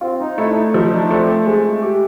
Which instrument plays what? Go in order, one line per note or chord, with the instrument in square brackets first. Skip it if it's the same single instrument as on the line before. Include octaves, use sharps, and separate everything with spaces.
[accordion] C4 [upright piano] F4
[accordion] D#4
[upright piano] A3 [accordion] E4
[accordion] D4
D#4
[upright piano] F3 [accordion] D#4
[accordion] D4
[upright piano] A3 [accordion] C4
[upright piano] G#3
G4